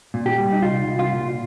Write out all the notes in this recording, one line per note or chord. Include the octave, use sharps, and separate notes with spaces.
A#2
G4
G3
D#4
C2 F4
C2
F4
A#2